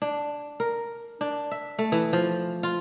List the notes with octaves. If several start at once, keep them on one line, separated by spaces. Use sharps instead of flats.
D4
A#4
D4
E5
A3
E3
F3
F4